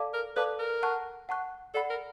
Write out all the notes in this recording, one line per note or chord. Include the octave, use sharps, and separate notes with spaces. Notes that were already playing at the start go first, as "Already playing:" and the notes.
Already playing: A4 D5 F5 A5 D6
A#4
A4 B4 D5 F5 A5 D6
A#4
F#5 A5 C#6 F#6
F#5 A5 C#6 F#6
A4 D5 F#5 B5
A#4